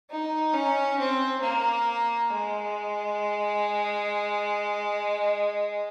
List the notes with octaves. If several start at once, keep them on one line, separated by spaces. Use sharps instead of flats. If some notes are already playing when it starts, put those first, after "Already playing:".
D#4
C#4
C4
A#3
G#3